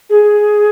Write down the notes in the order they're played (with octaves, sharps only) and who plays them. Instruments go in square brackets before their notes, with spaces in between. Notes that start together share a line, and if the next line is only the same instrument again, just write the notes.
[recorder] G#4